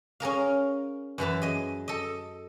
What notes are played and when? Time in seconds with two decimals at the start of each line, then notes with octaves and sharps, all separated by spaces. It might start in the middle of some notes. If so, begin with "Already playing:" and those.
0.20 C#4 G#4 A#4 F5
1.18 F#2 E3 B4 A5
1.42 G#4 D#5
1.88 A4 D#5